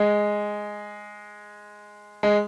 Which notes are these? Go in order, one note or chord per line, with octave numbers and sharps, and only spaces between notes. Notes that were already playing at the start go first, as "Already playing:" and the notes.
Already playing: G#3
G#3